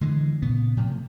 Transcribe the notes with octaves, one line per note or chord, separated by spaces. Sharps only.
D3 E3 G#3
A#2 C#3 B3
A2 C3 F3